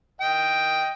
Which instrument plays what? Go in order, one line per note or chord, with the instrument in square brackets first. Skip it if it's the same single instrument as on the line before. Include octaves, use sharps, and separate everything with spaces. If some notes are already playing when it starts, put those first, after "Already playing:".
[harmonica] D#5 G5